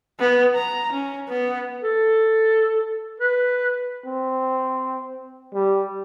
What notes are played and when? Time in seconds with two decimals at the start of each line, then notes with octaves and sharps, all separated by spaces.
0.20 B3
0.56 A#5
0.93 C#4
1.29 B3
1.83 A4
3.20 B4
4.06 C4
5.54 G3